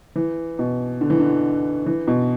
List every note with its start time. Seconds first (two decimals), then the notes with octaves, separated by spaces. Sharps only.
0.16 E3
0.59 B2
1.01 D3
1.10 E3
1.20 D3
1.86 E3
2.08 B2